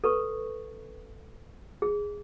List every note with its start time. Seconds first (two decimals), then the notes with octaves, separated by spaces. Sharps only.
0.04 A4 B4 C#6
1.82 G#4